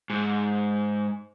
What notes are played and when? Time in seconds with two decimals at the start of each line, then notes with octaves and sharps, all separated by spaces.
0.10 G#2